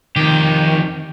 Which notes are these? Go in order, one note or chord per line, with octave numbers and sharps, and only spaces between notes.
F2 D#3 G4